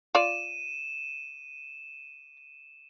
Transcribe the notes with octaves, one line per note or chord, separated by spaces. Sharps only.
F4 C#5 D5 D#7 E7